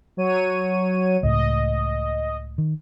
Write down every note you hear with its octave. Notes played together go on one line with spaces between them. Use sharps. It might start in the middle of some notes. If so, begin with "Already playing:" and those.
F#3 C#5 D#7
C#2 A2 D#5
D#3